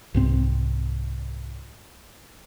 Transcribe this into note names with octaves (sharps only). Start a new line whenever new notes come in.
C2 G#2 C4